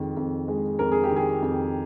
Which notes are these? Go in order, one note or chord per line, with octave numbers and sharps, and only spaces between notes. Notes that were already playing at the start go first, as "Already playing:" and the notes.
Already playing: F2 D#3 G#3
F2
G#3
F2 A#4
G#4
G4
D#3
G#4
F2